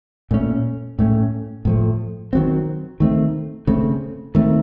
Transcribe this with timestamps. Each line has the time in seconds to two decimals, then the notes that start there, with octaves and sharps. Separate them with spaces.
0.31 A#2 A3 C#4
0.99 A2 A3 C#4
1.65 A2 F3 A3
2.33 D#3 F#3 C4
3.00 D#3 A3 C4
3.67 C#3 A3 C4
4.35 D#3 A3 C4